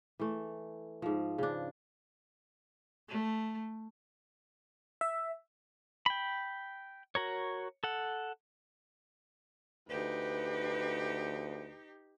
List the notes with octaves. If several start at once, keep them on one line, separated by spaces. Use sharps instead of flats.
E3 A3
G#2 F3
C#3 D4
A3
E5
G5 B5
F#4 A#4 C#5
A4 F#5
D2 D#4 G4 B4